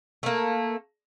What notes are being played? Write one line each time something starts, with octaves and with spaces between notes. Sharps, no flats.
A3 A#3